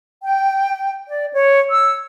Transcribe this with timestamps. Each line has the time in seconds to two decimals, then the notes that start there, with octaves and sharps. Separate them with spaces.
0.23 G5
1.09 D5
1.33 C#5
1.70 E6